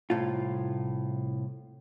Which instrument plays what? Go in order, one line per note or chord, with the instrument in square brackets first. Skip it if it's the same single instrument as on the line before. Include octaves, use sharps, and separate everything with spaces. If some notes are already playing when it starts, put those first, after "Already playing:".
[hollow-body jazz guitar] C2 A2 F4